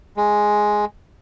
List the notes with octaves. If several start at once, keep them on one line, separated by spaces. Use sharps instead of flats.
G#3